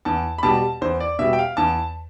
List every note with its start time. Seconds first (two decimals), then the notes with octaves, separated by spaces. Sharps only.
0.05 E2 A5
0.38 B5
0.43 B2 G3 A5
0.82 E2 C5
1.00 D5
1.19 B2 G3 E5
1.33 G5
1.39 F5
1.57 E2 A5